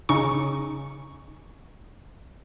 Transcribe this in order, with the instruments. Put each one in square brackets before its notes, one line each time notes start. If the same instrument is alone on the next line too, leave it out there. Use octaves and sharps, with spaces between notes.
[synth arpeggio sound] C#3 D#4 C#6